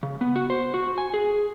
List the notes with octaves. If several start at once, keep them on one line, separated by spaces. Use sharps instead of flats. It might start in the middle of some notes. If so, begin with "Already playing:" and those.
C#3
B3
F#4
C5
F#4
G#5
G#4